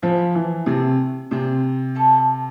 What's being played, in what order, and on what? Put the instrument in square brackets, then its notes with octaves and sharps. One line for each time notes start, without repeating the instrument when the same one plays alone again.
[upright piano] F3 [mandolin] G#4 B4 E5
[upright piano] E3
[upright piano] C3 [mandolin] A3 C4 G#4
[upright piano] C3 [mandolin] D4 G#4 C5
[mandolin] A3 E4 A4